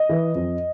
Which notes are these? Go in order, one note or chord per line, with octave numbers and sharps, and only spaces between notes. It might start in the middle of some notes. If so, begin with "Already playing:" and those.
Already playing: D#5
E3
F2